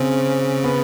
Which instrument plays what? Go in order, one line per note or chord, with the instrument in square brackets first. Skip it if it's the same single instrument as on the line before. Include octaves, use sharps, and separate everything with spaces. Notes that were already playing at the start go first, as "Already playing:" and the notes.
Already playing: [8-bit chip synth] C#3 [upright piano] C4 C#4
[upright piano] B3